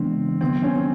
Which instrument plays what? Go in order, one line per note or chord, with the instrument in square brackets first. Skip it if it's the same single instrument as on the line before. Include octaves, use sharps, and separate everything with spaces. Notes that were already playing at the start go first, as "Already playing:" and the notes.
Already playing: [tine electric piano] C#3 E3 G#3 B3 D4 [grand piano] C4
[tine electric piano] D#3 F#3 B3 [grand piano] C4
[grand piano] C#4
C4